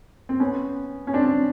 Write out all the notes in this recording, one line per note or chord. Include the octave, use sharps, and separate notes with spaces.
C4
B3 C#4
C#4
C4 D4